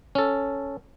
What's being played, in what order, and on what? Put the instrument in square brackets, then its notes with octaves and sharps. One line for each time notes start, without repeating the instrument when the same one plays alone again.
[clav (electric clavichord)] C#4 A4